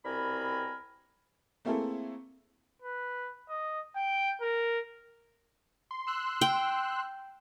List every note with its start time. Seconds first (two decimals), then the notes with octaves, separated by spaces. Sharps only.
0.05 C2 B2 C4 A#4 G#5 B5
1.65 A3 A#3 C4 E4 G#4 A4
2.82 B4
3.49 D#5
3.96 G5
4.41 A#4
5.91 C6
6.07 C6 E6 F#6
6.41 G5